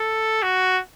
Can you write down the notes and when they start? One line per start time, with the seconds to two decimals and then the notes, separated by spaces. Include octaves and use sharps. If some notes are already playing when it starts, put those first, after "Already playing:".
Already playing: A4
0.42 F#4